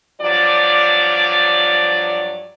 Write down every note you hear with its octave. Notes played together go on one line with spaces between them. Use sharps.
G2 F3 F#3 D5